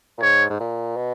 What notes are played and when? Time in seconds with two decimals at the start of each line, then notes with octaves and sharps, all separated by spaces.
0.18 A#2
0.22 G#2 C#5
0.50 G#2
0.60 A#2
0.96 B2